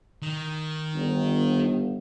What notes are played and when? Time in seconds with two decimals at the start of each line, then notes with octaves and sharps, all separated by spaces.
0.22 D#3
0.94 G1